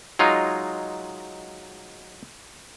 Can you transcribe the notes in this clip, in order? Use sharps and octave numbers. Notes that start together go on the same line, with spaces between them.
F#3 G#3 D#4 F4